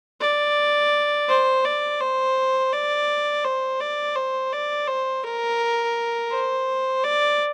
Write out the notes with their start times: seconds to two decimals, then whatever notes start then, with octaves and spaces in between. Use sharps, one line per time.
0.21 D5
1.29 C5
1.65 D5
2.00 C5
2.73 D5
3.44 C5
3.80 D5
4.16 C5
4.52 D5
4.88 C5
5.24 A#4
6.32 C5
7.04 D5